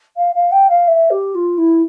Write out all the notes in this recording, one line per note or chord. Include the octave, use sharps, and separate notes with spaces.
F5
F5
G5
F5
E5
G4
F4
E4